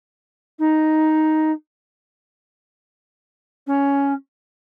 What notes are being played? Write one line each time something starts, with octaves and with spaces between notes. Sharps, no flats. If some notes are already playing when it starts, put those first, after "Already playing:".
D#4
C#4